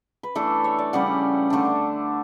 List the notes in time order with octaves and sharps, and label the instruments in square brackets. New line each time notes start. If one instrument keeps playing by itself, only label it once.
[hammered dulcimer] B4
E3 A3 D4 A4
C#5
D5
C#3 G3 C#4 F#5
D3 A3 D4